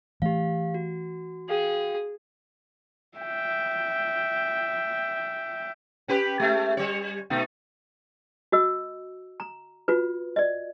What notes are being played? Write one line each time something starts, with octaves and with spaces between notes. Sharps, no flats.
E3 A3 G4 F5
F#4
F#4 G#4 F5 G5
E5 G5
C#4 G4 B4
G#3 A3
G3 C#5
B2 A3 D#4
F#4 D#5 E6
A#5
F4 F#4 B4
D5 D#5